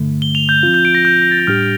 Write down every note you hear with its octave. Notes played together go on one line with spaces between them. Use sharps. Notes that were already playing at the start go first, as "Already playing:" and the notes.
Already playing: G2 D3 A3
G7
F7
G6
F3 C4 F4
G6
D7
A#6
G6
A#6
A6
G6
A2 G3 D4 G4 F6